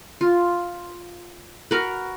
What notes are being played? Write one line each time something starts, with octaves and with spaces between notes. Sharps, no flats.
F4
F#4 A#4 B4